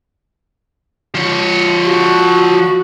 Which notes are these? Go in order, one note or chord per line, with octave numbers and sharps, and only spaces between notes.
F3 C#5
F#4